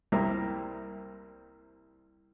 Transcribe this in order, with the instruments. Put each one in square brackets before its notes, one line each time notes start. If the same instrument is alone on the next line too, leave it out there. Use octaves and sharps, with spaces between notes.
[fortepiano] C2 C3 G3 A#3 A#4 E5